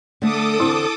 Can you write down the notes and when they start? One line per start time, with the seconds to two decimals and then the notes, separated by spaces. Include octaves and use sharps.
0.22 D3 A3 A4 A5 D6 D#6
0.60 E2 D3 C4 E4